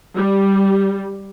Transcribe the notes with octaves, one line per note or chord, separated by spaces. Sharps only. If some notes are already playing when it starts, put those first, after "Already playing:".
G3